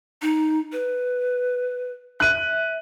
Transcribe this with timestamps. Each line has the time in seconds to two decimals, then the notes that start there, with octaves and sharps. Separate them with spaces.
0.22 D#4
0.72 B4
2.20 E5 F#6 D#7